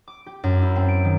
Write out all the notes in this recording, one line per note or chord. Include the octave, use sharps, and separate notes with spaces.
D6
G4
F#2
E4
C4
D7
D#3